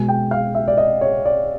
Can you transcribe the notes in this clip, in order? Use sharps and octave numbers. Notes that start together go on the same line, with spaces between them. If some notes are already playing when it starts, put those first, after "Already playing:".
Already playing: B2 G#3 G#5
G5
F5
E5
D5
D#5
C#5
D5